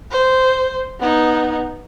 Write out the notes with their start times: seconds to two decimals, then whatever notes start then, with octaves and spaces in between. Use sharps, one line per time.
0.11 C5
1.00 B3 D#4